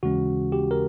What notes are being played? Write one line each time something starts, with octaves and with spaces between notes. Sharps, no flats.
D#2 C#3 E3 G#3 C#4 F#4
G4
A#4